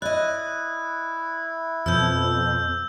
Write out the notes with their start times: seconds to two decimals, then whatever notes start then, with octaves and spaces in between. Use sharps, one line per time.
0.02 E4 D5 D#5 F#6
1.86 F2 B2 F3 E6 G6